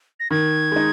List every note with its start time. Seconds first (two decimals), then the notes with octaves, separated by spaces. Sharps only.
0.20 A#6
0.31 D#3 G#6
0.72 G#3 D#4